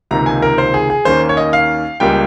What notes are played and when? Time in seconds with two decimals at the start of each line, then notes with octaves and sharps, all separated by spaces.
0.11 C#2 C3 D#3 A#3 A#5
0.26 G#5
0.42 A#4
0.58 C5
0.74 G#4
0.90 G#4
1.05 D#2 D#3 A#3 C#4 C5
1.29 C#5
1.37 D#5
1.53 F5
2.00 C#2 C#3 G3 A#3 C#4 G5